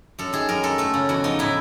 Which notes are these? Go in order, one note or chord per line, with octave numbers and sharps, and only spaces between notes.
F#2 A4
D#3 G#4
F#2 A#4
G#3 A4
A3 A4
C#3
E2 F#4
F3 D#4
A2 E4